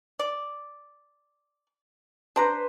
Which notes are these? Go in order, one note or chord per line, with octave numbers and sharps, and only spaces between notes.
D5
D4 B4 C5 A#5